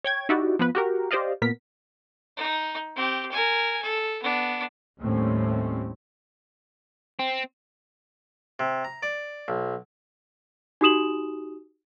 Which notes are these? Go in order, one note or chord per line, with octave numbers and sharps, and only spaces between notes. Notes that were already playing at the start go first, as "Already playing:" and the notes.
C#5 G5 G#6
D#4 E4 F#4 G4 D5
F3 B3 B4
F#4 G4 A#4
G4 C5 D5 D#5 F5
A#2 B3 A#4 B6
D#4
C4 G4
A#4 G#5
A4
B3 D4
D#2 A2 G3 A3 C4 C#4
C4
C3
A#5
D5
B1
D#4 F#4 G4 D#6 E7 F#7